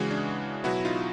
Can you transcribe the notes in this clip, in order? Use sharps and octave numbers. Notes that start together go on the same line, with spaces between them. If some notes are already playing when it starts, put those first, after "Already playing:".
Already playing: C#3 E3 G#3 F#4 G#4
D4
B2 F#3 B3 E4 F#4
D#4 F4